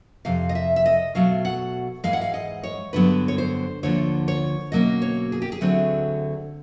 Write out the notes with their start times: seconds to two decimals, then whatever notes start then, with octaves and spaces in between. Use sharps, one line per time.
0.25 F2 C3 F5
0.49 D#5
0.55 E5
0.76 E5
0.86 D#5
1.15 B2 F#3 A3 F5
1.45 F#5
2.04 G#2 E3 G#3 F5
2.13 F#5
2.21 F5
2.34 D#5
2.63 C#5
2.93 G2 D3 F#3 B3 B4
3.28 C#5
3.38 C5
3.83 D2 D3 F3 A#3 C#5
4.28 C#5
4.72 B2 F#3 A#3 C#4 D#5
5.02 C#5
5.32 G#4
5.42 G4
5.52 G#4
5.61 D2 D3 F#3 A3 C4